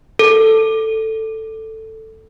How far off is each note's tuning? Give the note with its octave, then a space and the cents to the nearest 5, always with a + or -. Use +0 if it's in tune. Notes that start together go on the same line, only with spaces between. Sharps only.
A4 +5